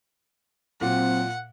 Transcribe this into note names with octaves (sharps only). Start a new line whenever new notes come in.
A#2 F#3 C4 F#5